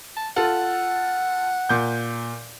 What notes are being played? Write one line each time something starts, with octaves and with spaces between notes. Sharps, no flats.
A5
F4 A4 F#5
A#2 G6